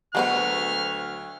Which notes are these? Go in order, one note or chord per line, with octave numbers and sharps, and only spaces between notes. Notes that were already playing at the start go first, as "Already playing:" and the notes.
D2 F#3 G#3 B3 C5 F6